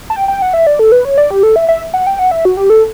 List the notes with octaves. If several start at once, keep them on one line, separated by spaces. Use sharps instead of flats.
A5
G5
G5
F#5
E5
D5
A4
B4
C#5
D5
G4
A4
E5
E5
F#5
G5
F#5
E5
F#4
G4
A4